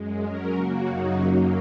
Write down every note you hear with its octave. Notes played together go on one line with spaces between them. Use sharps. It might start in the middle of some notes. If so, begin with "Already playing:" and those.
Already playing: F#2 G#3
F#3 C#4 A#4
C#3 A#3 F#4
F#2 C#3 F#3 D#4 F#4
F#2 F#3 A#3